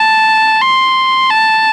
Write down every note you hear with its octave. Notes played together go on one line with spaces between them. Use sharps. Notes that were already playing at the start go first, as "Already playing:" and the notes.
Already playing: A5
C6
A5